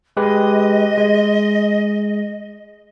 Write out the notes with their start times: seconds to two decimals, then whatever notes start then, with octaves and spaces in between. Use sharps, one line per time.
0.17 G#3 G4 B4 D#5
0.97 G#3